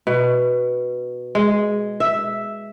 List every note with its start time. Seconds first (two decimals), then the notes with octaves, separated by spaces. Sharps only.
0.07 B2
1.35 G#3
2.00 E5